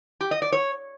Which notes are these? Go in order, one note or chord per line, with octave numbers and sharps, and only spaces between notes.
G4
D#5
D5
C#5